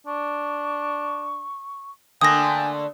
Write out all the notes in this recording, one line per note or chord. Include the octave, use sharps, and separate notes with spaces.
D4 C#6
D3 A3 A#3 G5 G#5 D#6 A#6